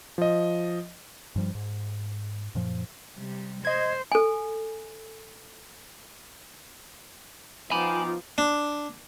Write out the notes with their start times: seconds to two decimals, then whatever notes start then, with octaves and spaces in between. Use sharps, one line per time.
0.18 F3 D#5
1.36 G2 F3 G3
1.55 G#2
2.55 F#2 A#2 F3
3.16 C3 G3
3.65 C5 D#5 G#6
4.12 A4 G#5
7.71 F3 B3 D#4 F4 G5 G#5 B5 D6
8.38 D4